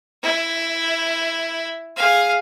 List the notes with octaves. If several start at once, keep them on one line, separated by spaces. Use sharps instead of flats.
E4
G#4 F5